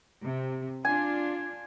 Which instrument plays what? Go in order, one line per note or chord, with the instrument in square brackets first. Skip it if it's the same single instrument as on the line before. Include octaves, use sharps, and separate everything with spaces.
[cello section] C3
[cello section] D4 F4 [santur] G#5